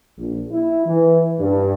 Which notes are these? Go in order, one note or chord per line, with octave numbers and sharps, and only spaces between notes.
A#1
E4
E3
G2